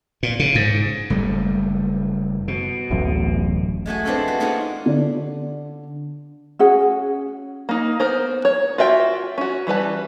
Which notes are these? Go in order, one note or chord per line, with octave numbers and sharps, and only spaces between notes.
A#2
C#3
G#2
F#1 G3 A3
B2
D1 A1 F#2
G#3 A3 F#4 G#5
B3 C4 D4 E4 F4 A4
D#4 F#4
A#3 C#4 D#4 F4 G#4 F#5
D3 D5
C#4 F#4 G#4 F#5
A#3 D#4
B3 A#4 C5
C#5
F4 F#4 E5 G5
C#4 F#4
E3 G3 B4 A5